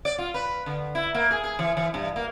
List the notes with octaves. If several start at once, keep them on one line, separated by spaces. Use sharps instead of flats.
D5
F4
B4
D3
E4
A#3
G#4
G#4
E3
E3
G2
A#3